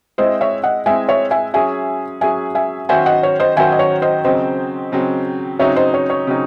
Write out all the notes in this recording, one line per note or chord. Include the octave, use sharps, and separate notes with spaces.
G#3 C4 E4 C5 D#5
C#5 E5
D#5 F#5
G#3 C4 E4 E5 G#5
C#5 E5
E5 G#5
F#3 C#4 G#4 E5 G#5
F#3 C#4 G#4 E5 G#5
E5 G#5
D#3 F#3 C#4 F#4 C5 E5 G#5
D#5 F#5
C#5
C5 D#5
D#3 F#3 C#4 F#4 C5 E5 G#5
D#5
C#5
C5 D#5
C#3 F#3 C4 C5 D#5
C#3 F#3 C4
C#3 F#3 C4 D#4 C#5 E5
C5 D#5
C#5
C#5
C#3 F#3 C4 D#4